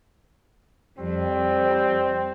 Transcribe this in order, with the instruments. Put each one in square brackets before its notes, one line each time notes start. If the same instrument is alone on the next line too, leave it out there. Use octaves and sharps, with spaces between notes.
[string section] F2 [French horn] G3 [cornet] C4